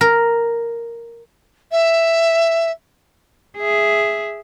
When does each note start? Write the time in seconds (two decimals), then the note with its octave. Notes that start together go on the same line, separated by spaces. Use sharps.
0.01 A#4
1.71 E5
3.57 G#4 E5